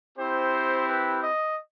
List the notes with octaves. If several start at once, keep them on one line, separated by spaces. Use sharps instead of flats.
C4 E4 G4 C5
B4
D#5